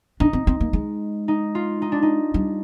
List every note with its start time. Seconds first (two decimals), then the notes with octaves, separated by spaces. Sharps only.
0.20 D4 D#4
0.33 C4
0.47 C4
0.61 A#3
0.73 G#3
1.28 D#4
1.55 F4
1.82 D#4
1.92 D4
2.03 D#4
2.34 G3